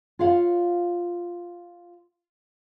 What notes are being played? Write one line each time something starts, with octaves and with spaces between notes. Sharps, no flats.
F4 C#5 F5 F#5